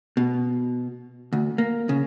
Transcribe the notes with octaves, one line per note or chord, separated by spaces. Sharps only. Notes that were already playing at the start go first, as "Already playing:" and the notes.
B2
D2
A#3
C#3